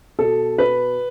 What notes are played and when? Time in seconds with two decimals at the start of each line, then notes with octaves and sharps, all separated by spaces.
0.19 B2 A4
0.58 B4